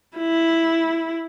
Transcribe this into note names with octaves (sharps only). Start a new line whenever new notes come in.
E4